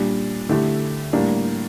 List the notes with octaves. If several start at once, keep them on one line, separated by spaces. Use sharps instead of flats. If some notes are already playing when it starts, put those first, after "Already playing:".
Already playing: A#2 G3 D4
D3 A3 E4 G4
A2 G3 A#3 D4